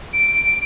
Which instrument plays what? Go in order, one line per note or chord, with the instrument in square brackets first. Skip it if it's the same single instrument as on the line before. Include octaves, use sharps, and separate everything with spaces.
[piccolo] D7